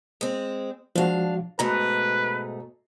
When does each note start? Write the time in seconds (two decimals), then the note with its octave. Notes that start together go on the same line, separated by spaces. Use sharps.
0.21 G#3 C4
0.96 F3 G#3 D4 F#4 F5
1.59 G#2 B2 A3 B4 A#5